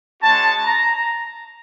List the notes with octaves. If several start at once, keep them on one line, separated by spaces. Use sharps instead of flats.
G#3 C#4 F#4 A5
A#5